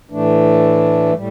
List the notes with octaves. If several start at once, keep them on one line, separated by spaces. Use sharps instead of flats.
A2 E3 A3 D4
A2 G3